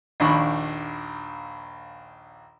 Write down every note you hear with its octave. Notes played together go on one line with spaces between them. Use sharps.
A#1 D#2 D4 B5 C#6